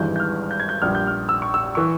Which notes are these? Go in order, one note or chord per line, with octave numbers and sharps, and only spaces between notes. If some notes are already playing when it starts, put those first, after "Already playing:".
Already playing: G#1 G2 E3 G#3 G6
G6
F6
G6
G#6
G6
A#1 A#2 G3 F6
G6
F6
E6
C#6
E6
E3 C#6